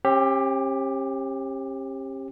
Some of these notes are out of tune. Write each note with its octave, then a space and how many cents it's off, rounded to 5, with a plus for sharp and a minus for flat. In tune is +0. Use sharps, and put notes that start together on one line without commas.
C#4 -45 G4 +15